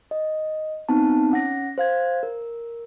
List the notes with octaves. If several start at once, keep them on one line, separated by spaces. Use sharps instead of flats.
D#5
B3 C4 D#4 A5
C#4 F#5 A#6
C5 F5 G#6
A#4